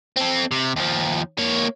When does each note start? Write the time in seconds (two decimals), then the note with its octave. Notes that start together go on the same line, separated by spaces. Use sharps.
0.16 C4 A4
0.51 C3
0.76 D#2 F3
1.38 A#3 C#5